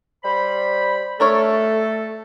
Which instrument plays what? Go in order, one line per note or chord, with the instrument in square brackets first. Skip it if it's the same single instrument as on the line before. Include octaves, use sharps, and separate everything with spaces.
[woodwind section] G3 C5 B5
[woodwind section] A3 A4 [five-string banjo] D4 A#4 C#5